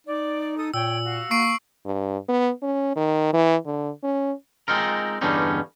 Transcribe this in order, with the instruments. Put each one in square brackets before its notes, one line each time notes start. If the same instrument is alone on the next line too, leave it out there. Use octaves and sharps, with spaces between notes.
[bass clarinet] D#4 [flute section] D5
[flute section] A4 D#6
[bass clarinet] A#2 [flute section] C#5 G5 [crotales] E6
[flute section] F#4 F5
[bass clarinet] A#3 [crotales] C#6 C7 D7
[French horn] G2
B3
C#4
D#3
E3
D3
C#4
[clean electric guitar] G#3 C4 D#4 F4 A#4
E2 G2 D3 G3 C#4 D#4